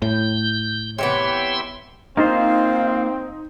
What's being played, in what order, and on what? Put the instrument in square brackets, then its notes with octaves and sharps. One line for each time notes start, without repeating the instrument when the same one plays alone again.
[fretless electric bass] A2 [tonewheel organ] G6
[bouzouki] C3 E3 B3 [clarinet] C#5 [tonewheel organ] E5 G5 C6
[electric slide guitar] A#3 F4 C5 [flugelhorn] C4 [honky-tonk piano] D#4 [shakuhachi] F5